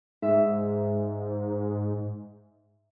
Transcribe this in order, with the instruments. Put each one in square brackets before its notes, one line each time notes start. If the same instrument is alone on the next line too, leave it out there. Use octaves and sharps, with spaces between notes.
[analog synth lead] G#2 [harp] E5